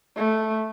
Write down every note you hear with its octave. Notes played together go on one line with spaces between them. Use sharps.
A3